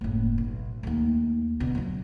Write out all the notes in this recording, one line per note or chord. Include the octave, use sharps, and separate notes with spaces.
F#1 A2
B1
D#2 A3
B2 D3
F#2 F#3